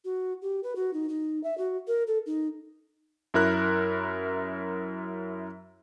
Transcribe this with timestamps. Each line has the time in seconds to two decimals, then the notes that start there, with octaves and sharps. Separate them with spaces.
0.05 F#4
0.42 G4
0.63 B4
0.76 F#4
0.93 D#4
1.09 D#4
1.43 E5
1.58 F#4
1.87 A#4
2.07 A4
2.26 D#4
3.34 F#2 E4 A#4 F#6